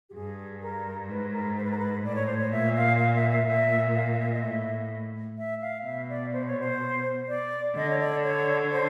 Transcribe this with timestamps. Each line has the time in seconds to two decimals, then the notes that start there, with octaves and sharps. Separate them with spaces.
0.10 G4
0.14 G2 G#4
0.62 A#4
1.09 G#2 B4
1.33 A#4
1.57 C5
1.64 B4
1.71 A#4
1.78 B4
2.04 A2 D5
2.15 C#5
2.26 C5
2.37 C#5
2.52 A#2 E5
2.76 F5
2.99 F5
3.16 E5
3.32 E5
3.47 A#2 E5
3.95 F5
4.13 F5
4.19 E5
4.32 D#5
4.42 A2 E5
5.38 E5
5.61 F5
5.86 B2 E5
6.09 D5
6.33 C5
6.46 C#5
6.60 C5
7.28 D5
7.76 D3 D#5
7.90 C#5
7.99 D5
8.24 C#5
8.71 C5